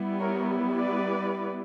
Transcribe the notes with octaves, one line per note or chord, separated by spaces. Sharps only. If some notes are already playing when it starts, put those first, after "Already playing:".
Already playing: G3 B3 E4
A#4 C#5
B4 D5